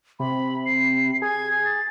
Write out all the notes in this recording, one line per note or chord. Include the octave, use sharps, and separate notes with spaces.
C3 B5
C7
G#4 G#6
A6